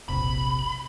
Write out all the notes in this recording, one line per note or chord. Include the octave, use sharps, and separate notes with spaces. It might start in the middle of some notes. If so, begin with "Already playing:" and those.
E1 A#1 C3 B5